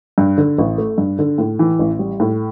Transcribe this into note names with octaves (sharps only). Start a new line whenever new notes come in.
G2
D3
A1
A3
G2
D3
A2
E3
A1
G3
A2